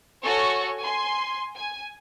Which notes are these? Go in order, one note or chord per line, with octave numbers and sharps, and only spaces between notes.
F#4 A4 C#5 G#5 C#6
G#5 C6
G#5